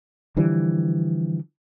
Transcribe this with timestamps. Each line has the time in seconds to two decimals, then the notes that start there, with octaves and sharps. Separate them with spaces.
0.37 D3 E3 F3 G3